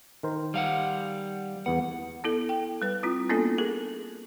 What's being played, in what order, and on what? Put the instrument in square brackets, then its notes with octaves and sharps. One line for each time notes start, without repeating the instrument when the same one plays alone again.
[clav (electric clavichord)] D#3 A#4 C5
[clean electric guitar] G3 F5 F#5
[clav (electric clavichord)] E2 B3 [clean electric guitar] F#5
[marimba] B3 E4 A4
G5
G3 B4
C4 E4 F4
A#3 B3 C#4 D4 F4 A4
G#4 A#4